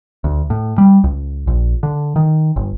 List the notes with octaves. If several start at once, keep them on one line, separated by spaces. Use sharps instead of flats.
D2
A2
G3
C#2
A#1
D3
D#3
G1